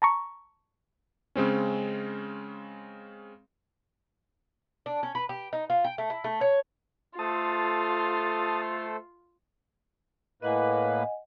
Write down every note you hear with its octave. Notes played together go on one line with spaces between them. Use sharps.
A5 A#5 C#6
C#3 G#3 C4 C#4
D4
C#4
B4
G4
D#4
F4
G5
A3
E4
A3
C#5
A3 F4 A4 C5 A5 D#6
A2 A#3 B4 D#5 F#5 G#5